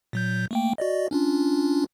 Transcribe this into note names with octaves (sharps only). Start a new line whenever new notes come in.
A#2 F#3 G6
A3 A#3 G5
F#4 D5 D#5
C#4 D4 F4